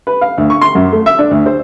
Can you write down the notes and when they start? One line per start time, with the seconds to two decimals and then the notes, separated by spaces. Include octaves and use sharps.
0.07 B4
0.21 F5
0.38 D2
0.50 C#6
0.61 C6
0.75 F#2
0.93 A3
1.06 E5
1.18 D4
1.31 D2
1.46 C5